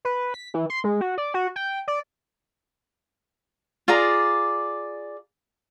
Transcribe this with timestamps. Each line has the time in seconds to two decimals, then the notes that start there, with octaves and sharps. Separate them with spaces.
0.05 B4
0.34 B6
0.54 E3
0.70 C6
0.84 G#3
1.01 F#4
1.18 D5
1.34 F#4
1.56 G5
1.88 D5
3.88 F4 G#4 D5 A#5